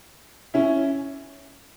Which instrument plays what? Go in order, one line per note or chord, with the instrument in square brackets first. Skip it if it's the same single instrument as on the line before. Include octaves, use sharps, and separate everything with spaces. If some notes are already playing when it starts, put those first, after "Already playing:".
[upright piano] C#4 E4